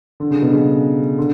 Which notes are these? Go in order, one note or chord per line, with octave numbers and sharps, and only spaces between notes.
D3
C#3
B2
C#3
D3